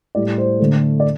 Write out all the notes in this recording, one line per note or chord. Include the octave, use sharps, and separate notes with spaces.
A2 G3 D5
C5
D3 A3
D5